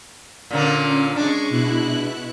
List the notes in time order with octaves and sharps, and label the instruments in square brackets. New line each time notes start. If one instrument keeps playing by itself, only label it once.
[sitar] A#2 D3 A#3 [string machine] C#4
[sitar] G#3 D4 [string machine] C#6
[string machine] B2 E4 F#6